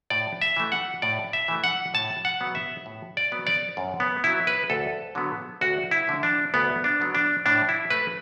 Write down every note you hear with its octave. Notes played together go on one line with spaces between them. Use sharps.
A2 D5
E5
E3 A3
F#5
A2 D5
E5
E3 A3
F#5
A2 A5
F#5
F#3 B3
E5
A2
D5
F#3 B3
D5
F#2
B3
F#3 B3 E4
B4
D2 A4
D3 F#3 B3
D2 F#4
E4
D3 A3
D4
D2 B3
D4
D3 F#3 B3
D4
A2 D4
E4
A3 B4